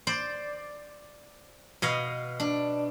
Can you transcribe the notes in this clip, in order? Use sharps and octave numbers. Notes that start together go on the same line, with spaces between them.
C5 D5
B2 D#5 F5
D4